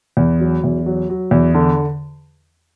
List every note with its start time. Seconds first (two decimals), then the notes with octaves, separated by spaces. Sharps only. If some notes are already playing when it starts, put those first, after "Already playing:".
0.17 E2
0.40 F#3
0.64 E2
0.86 F#3
1.10 F#3
1.31 E2
1.54 D3